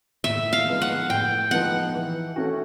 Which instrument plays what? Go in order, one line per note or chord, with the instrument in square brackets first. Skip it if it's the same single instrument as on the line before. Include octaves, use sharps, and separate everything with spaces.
[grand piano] A2 [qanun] E5
[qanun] F5
[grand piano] F3 G#3 B3 D#4
[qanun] F#5
[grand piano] A2 [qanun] G5
[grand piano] F3 G#3 B3 D#4 [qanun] F#5
[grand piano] E3
A3 C#4 F#4